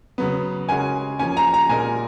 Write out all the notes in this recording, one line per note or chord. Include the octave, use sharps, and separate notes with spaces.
C#3 F#3 B3
C#3 G#3 C#4 F#4 A#4 G#5
F3 A#3 C#4 G#5
A#5
A#5
A#2 G#3 D#4 A#4 G#5